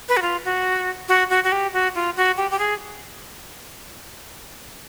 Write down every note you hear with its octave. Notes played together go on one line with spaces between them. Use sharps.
B4
F#4
F4
F#4
F#4
F#4
F#4
G4
F#4
F4
F#4
G4
G4
G#4